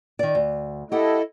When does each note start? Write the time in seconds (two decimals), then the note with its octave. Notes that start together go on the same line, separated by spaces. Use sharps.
0.19 D#3 D5
0.35 D2
0.92 E4 G4 A4 D#5 F#5